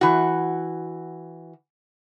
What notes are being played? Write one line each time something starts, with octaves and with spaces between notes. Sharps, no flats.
E3 F#4